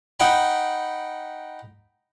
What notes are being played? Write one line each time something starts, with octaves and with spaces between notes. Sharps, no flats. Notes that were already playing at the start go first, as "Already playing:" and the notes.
D#4 F#5 G5 B5